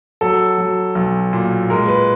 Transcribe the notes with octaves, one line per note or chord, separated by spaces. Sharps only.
F#3 A4
F#3
B1
A#2
G#3 A#4
B4